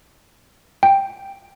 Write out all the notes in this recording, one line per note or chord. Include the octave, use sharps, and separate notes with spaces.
G5